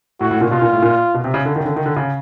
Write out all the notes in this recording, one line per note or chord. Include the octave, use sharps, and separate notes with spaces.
A2 F#4
A2
A#2
B2 F4
A#2
A2
A#2
B2
C3
C#3
D3
D#3
C#3
D3
D#3
D3
C#3